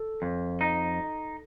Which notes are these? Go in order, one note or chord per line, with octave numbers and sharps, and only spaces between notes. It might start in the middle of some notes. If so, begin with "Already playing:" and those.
Already playing: A4
F2
D#4